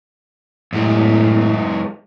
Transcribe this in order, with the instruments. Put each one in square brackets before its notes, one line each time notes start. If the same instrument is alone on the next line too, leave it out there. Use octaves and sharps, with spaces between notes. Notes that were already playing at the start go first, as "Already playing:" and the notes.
[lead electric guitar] F#2 G#3 [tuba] A2